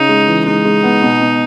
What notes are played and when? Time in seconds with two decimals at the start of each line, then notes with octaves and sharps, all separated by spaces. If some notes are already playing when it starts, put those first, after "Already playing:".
Already playing: C#3 D#4
0.09 G#3
0.27 E3
0.47 G#3 D#4
0.65 G#3
0.83 B3
1.02 B2
1.21 B2